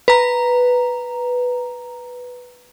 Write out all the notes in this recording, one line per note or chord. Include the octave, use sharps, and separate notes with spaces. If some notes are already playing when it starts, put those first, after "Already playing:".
B4 A#5